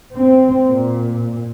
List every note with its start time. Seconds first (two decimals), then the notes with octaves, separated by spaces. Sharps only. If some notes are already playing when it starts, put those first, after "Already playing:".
0.14 C4
0.68 A#2